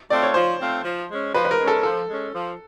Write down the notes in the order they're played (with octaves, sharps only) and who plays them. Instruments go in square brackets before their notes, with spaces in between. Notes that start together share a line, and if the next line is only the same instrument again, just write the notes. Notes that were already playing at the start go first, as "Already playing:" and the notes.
[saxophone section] A3 C4 F4 [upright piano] D5
[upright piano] C#5
[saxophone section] F3 [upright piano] C5
[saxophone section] A3 C4 F4
F3
G#3 C#4
[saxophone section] F3 [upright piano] B4
[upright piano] B4
A#4
[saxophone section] G#3 C#4
[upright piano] A4
[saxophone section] F3 [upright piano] A4
[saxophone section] G#3 C#4
F3